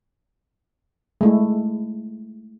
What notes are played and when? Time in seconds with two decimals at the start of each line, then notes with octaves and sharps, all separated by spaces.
1.21 G#3 A3 E4